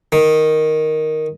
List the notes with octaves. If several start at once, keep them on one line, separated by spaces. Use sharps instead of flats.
D#3